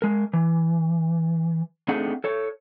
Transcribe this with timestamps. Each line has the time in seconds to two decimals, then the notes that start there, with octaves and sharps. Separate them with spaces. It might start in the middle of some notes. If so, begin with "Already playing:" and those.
0.02 G#3 A#4
0.33 E3
1.88 A3 C4 D4 D#4 G#4 F#5
2.24 A4 C#5